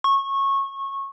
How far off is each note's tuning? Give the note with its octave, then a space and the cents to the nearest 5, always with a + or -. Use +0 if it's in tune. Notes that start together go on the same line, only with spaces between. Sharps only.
C#6 -20